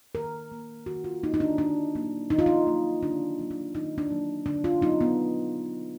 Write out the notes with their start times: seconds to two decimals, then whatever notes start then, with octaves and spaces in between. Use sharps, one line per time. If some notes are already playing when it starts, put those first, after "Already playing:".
0.15 D#3 A#4
0.52 A#3
0.86 D#3 F#4
1.04 F4
1.23 A#3 D#4
1.34 D#4
1.40 D4
1.58 D#3 D4
1.95 F#3 A#3
2.30 D#3 D#4
2.39 F4
2.46 D#4
2.67 F#3 A#3
3.02 D#3 D4
3.39 F#3 A#3
3.51 D4
3.74 D#3 D#4
3.98 D4
4.10 F#3 A#3
4.46 D3 D4
4.64 F4
4.82 F#3 B3 D#4
5.01 B3